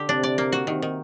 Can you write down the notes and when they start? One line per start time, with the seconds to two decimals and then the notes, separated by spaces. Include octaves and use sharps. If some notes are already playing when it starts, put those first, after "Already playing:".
Already playing: D3 G4
0.08 C3 D4
0.23 D5
0.38 A#3
0.52 F#4
0.67 C3 D#3
0.82 D#3